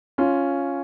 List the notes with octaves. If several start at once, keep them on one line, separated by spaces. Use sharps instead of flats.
C#4 F4